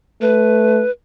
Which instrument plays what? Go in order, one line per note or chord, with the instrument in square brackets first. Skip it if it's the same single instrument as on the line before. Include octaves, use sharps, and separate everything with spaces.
[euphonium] A3 [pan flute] B4